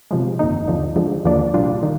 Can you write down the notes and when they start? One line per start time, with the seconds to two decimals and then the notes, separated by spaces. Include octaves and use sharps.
0.11 C3 F3 G#3
0.39 G1 F2 D#3 A#3 D#4
0.68 D#2 D3 F3
0.96 D3 F3 G#3
1.24 D#2 D3 F3 A#3 D4
1.54 C2 A#2 G3 D4 F4
1.83 D#3